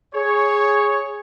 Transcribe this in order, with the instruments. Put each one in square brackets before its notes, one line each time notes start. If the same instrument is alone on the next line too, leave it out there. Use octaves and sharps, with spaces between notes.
[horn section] G#4 C#5